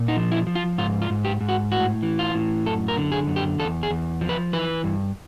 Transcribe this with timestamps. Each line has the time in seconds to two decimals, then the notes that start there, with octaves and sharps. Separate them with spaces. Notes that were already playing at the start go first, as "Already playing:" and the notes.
Already playing: A#2
0.08 D#4
0.17 F3
0.32 E4
0.47 F3
0.55 F4
0.78 G#2 F4
1.02 F4
1.10 G#2
1.25 G4
1.41 G#2
1.48 F#4
1.72 A2 F#4
2.03 E3
2.19 F4
2.35 A2
2.66 F#2 A4
2.88 A#4
2.97 D3
3.12 G#4
3.27 F#2
3.36 G4
3.59 E2 A4
3.83 G#4
3.91 E2
4.21 F3
4.29 B4
4.53 E3 B4
4.84 G2